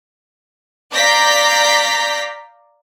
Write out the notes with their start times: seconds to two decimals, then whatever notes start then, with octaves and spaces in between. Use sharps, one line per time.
0.93 D5 F5 A#5 G6 A#6 B6